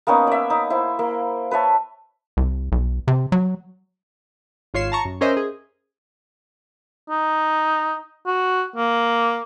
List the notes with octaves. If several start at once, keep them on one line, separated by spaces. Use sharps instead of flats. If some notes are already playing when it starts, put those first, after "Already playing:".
A#3 B3 C#4 D#4
D5 E5
D#4
E4 C5
A#3
B4 C#5 E5 A5
C2
B1
C3
F#3
G#1 F4 C#5 C7 E7
A5 A#5 C#6
F#2
C#4 A#4 C5 D#5 E5
G#4
D#4
F#4
A#3